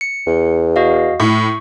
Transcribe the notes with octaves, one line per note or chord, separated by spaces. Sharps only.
C#7
E2
F#4 D#5 F5
A2 C#6